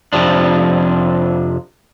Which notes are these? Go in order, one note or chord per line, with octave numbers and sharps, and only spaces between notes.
F2 C3 F3 D4